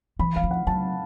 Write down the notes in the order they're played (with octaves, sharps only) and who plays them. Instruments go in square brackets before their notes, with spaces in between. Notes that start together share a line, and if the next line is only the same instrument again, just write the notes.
[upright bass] E3 [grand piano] B5
[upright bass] F#3 [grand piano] F5
[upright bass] F3
[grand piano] F#5
[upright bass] F#3 [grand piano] A5